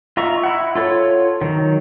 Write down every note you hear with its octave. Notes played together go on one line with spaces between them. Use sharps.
F4 D#5 E5 A#5 C#6
E4 F#5
F4 A4 C#5
D#3 F#3